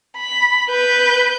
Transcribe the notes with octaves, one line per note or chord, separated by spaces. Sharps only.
B5
B4 G6